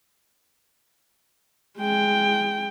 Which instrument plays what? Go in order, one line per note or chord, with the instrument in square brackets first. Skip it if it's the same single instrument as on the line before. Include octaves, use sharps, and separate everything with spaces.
[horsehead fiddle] G#3 G5